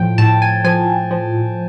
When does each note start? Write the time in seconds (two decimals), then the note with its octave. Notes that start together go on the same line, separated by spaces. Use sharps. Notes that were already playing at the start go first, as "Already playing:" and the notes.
Already playing: A2 F3 G5
0.18 A2 A5
0.42 G#5
0.64 F3 G#5
1.11 F3